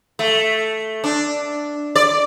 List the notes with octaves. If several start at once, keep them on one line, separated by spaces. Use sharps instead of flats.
A3
D4
D5